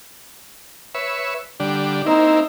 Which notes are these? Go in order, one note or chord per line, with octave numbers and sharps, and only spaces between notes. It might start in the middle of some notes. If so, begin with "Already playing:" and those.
B4 C#5 E5
D3 G3 D4
A#3 C4 D#4 E4